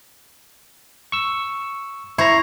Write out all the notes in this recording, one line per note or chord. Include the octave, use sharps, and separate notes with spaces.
C#6 E6
E4 C5 C#5 A#5